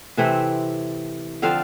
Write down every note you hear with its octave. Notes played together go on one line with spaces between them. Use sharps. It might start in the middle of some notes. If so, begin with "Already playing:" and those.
C3 E3 A3 C4 E5
D3 F3 C4 F5